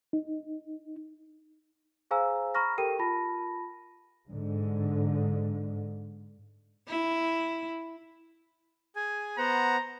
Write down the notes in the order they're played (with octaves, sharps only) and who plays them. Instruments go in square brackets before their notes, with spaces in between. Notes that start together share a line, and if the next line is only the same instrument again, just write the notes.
[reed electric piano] D#4
[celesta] G#4 C5 F5 G#5 A#5 E6
A#5 B5 C#6 F6 A#6
G4 A4 A#4 G5 D#7
F4 A5 B5 A#6
[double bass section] G#2 D3
[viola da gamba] E4
[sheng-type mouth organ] G#4 G#5
[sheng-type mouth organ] B3 C5 F#5 [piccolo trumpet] A#5